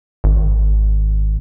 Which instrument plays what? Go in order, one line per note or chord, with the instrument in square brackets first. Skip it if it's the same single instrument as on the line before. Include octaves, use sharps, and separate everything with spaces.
[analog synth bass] G#1